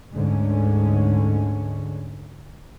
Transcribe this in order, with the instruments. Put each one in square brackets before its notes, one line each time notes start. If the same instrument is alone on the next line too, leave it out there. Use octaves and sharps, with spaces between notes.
[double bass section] D2 G#2 D3 G#3 C#4